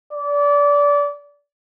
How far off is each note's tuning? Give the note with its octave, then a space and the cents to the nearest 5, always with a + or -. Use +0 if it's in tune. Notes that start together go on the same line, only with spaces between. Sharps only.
D5 -25